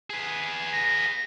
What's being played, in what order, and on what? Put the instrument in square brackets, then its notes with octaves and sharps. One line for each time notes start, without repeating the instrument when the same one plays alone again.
[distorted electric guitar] G#4 B4
[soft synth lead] A#6